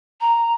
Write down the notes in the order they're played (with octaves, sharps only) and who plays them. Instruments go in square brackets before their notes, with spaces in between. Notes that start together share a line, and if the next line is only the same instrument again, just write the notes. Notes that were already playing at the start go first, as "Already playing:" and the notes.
[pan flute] A#5